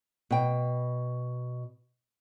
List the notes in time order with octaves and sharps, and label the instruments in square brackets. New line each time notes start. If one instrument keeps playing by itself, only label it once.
[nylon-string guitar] B2 G5